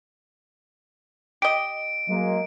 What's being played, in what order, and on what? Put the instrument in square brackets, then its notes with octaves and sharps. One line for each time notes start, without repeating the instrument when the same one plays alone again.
[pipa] G4 D#5 [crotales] D7
[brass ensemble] F#3 G#3 A#3